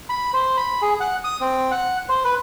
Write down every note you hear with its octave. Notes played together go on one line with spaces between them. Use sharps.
B5
C5
B5
G#4
F#5
D#6
C4
F#5
C5
B4